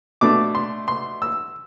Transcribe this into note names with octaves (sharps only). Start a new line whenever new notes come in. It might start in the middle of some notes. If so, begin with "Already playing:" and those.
B2 A3 D4 D6
C6
C6
E6